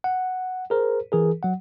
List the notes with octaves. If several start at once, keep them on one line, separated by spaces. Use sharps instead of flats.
F#5
G#4 A#4 C5
E3 G#4 A#4
F#3 F#5